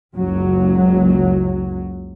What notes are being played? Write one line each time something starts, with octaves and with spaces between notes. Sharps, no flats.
F#1 C#2 F#3